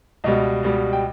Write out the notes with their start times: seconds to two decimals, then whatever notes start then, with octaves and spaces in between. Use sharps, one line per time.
0.24 C#2 B2 G3 D#5
0.63 C#2 B2 G3
0.93 G5